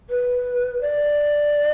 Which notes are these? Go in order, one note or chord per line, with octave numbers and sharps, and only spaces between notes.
B4
D5